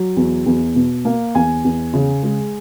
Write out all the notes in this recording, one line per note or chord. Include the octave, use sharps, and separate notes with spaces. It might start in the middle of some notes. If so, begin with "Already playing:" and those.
Already playing: F#3
E2
E2
B2
A#3
E2 G#5
E2
C#3
G#3